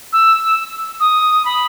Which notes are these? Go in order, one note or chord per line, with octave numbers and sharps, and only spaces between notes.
E6
D#6
B5